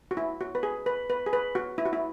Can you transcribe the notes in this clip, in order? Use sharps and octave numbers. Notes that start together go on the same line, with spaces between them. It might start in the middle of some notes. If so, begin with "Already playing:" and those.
F#4
E4
F#4
B4
G#4
B4
B4
G#4
B4
F#4
E4
F#4
E4